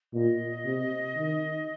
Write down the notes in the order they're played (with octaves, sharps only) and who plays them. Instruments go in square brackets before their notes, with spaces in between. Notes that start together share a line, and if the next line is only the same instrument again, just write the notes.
[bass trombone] A#2 [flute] D#5
[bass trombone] C3
D#3